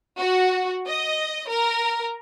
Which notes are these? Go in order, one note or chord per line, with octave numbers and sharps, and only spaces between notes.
F#4
D#5
A#4